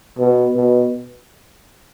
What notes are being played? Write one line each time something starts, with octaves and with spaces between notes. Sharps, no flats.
B2
B2